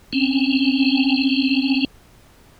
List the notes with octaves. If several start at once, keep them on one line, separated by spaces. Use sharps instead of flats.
C4 C#4